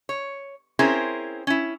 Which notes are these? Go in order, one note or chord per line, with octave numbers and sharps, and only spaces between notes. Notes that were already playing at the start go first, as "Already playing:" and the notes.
C#5
C4 C#4 E4 G#4 A#4 C5
C#4 E4